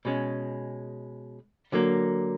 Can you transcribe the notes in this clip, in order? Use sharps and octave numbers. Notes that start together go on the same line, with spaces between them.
B2 G#3 C#4
D3 F#3 A#3